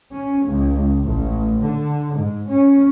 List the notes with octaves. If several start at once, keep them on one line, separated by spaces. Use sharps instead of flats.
C#4
C#2
A1
D3
G#2
C#4